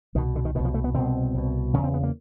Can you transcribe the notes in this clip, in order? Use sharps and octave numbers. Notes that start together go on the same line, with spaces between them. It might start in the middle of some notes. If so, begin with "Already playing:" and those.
C2 B2 D#3
D3
D#3
C2 B2 D#3
F3
A3
B3
C2 B2 C4
C2 B2
E2 C#3 C#4
C4
B3
A#3